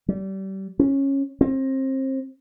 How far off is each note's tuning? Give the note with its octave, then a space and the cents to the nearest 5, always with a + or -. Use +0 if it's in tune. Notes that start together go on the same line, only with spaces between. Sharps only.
G3 -30
C#4 -15
C4 +30